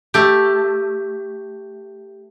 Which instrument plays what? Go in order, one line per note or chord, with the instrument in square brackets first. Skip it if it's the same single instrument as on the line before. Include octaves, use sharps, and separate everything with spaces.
[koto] A3 G4